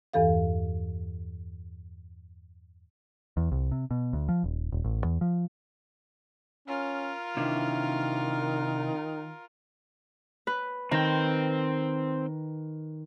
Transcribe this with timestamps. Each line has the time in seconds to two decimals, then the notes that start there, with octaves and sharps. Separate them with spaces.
0.13 E2 G2 E3 A4 F5
3.37 E2
3.52 C2
3.72 C3
3.91 B2
4.13 D2
4.29 F3
4.44 D#1
4.72 D#1
4.84 A1
5.04 E2
5.21 F3
6.68 C#4 F4 A#4
7.37 C3 D#3 D4 E4
10.47 B4
10.91 D#3 C4 G5